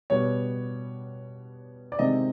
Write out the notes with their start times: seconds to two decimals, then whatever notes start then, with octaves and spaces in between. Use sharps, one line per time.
0.10 B2 G3 B3 C#5
1.92 D5
1.99 C3 D#3 G#3 C4 D#5